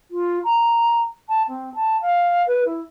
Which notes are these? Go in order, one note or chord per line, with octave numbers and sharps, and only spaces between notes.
F4
A#5
A5
C4
A5
F5
B4
E4